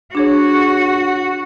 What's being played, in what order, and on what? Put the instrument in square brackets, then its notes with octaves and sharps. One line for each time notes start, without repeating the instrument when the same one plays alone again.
[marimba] D4 G#4 C#5 [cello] F#4